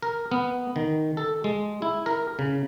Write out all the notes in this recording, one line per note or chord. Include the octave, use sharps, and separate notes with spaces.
A#4
B3
D#3
A4
G#3
E4
A#4
C#3